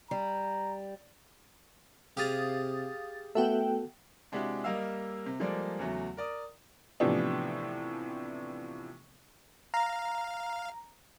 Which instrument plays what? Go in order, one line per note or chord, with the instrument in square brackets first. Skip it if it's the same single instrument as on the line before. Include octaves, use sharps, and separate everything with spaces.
[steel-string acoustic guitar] G3 [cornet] A#5
[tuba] C3 [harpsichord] G4 G#4 [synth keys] F5 D#6 A6
[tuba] A3 [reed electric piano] B3 F#4 A4 [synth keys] E5 F#5 G5
[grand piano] C3 G#3 D4 E4 F#4 G4
G3 A#3 D#5 F5 E6
C3
F3 G3 G#3 A#3 A4 D5
E2 C#3 F#3 A3
A#4 D5 D#6
[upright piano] A2 C3 E3 F3 B3 D4
[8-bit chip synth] F5 [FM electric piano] A#5